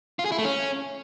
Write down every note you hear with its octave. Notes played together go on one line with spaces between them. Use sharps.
F4
G#4
E4
A3
C#4